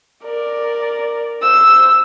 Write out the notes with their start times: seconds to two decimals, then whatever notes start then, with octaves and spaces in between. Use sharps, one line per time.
0.24 A#4 D5
1.42 C5 E6